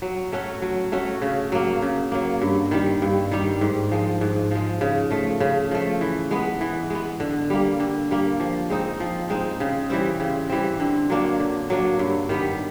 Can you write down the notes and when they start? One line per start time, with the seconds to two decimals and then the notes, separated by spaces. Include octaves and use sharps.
0.02 F#3
0.32 A3 C#4 F#4
0.62 F#3
0.92 A3 C#4 F#4
1.22 C#3
1.52 F#3 A#3
1.82 C#3
2.12 F#3 A#3
2.42 G2
2.71 D#3 G3
3.02 G2
3.32 D#3 G3
3.61 G#2
3.91 F3 G#3
4.21 G#2
4.51 F3 G#3
4.81 C#3
5.11 F3 A3
5.40 C#3
5.71 F3 A3
6.01 E3
6.31 G#3 B3
6.61 E3
6.90 G#3 B3
7.20 D3
7.50 G3 A#3
7.80 D3
8.11 G3 A#3
8.40 F3
8.70 G#3 C4 D#4
9.00 F3
9.30 G#3 C4 D#4
9.60 C#3
9.90 E3 G3 C4
10.20 C#3
10.50 E3 G3 C4
10.80 D3
11.10 F#3 A#3 D4
11.40 D3
11.70 F#3 A#3 D4
11.99 G2
12.29 D#3 G3 B3